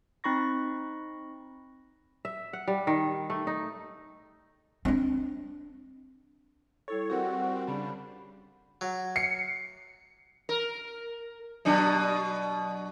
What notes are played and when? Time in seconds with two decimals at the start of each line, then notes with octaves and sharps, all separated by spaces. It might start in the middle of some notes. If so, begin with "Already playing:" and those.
0.24 C4 D#4 B5 C#6 A#6
2.25 E5
2.53 F#5
2.67 G3
2.87 D#3
3.30 A3
3.47 D#4
4.85 C4 D4
6.88 G3 E4 A4 C#5
7.10 G3 C4 F#4 G4 A#4 F#5
7.67 C#3 G3 D4 B5
8.81 F#3
9.16 C7 C#7
10.49 A#4
11.65 B2 F#3 D4